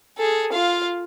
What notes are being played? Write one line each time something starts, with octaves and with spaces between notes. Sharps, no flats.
G#4 A4
F4 F5